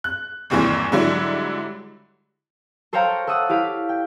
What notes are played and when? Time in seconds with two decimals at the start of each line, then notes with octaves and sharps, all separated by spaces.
0.04 F#6
0.50 G1 D#2 C3 E3 G3
0.92 G#2 D3 F#3 G3 E4
2.93 A4 C5 C#5 F5 G5 A#5
3.27 A4 E5 F#5 D#6 E6
3.49 E4 G4 F5 B5
3.89 G5